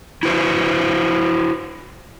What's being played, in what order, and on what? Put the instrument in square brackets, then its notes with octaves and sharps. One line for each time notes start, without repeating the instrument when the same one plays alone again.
[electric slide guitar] E4 F#4 B4 C5